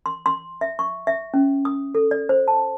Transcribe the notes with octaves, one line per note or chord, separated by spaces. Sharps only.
C6
C6
E5
C#6
E5
C#4
D#6
A4
D5
C5
A5